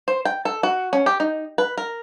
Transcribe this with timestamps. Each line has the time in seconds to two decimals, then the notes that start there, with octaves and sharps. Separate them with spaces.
0.08 C5
0.25 G5
0.45 A4
0.63 F#4
0.93 C#4
1.06 G4
1.20 D#4
1.58 B4
1.78 A#4